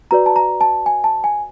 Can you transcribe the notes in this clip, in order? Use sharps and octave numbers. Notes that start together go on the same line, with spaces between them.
F#4 B4 D5 A#5
A5
A#5
A5
G#5
A5
G#5